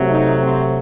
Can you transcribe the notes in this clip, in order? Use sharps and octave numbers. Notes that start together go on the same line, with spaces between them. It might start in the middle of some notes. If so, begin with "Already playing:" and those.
Already playing: C3 F#3 A3
D#4
C4